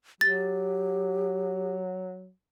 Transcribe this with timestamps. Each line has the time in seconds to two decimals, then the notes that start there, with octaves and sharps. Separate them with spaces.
0.21 F#3 G4 A6